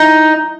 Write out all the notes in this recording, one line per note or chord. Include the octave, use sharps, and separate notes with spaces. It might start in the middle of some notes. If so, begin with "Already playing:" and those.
Already playing: D#4